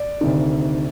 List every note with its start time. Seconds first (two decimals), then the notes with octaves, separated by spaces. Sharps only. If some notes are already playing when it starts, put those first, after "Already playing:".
Already playing: D5
0.21 D2 C3 D#3